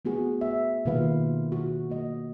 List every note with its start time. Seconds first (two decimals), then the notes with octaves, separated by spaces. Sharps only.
0.05 A3 B3 F#4 G#4
0.41 E5
0.85 B2 D#3 A#3 F4 B4 F5
1.52 F#4
1.90 A#3 D#5